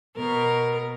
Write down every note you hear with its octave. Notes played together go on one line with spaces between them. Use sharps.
B2 A#4